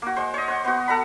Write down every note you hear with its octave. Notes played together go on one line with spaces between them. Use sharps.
A#3 F#4
G#3 C5
C#5 D#5
C5 F#5
B3 F#4
A4 F#5 A#5 B5